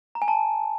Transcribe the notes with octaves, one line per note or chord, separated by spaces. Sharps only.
A#5
G#5
A5